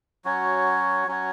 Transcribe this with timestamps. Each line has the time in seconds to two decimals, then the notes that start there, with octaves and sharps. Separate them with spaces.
0.25 F#3 C#4 F#4 C#5
1.07 F#3 C#4 F#4 C#5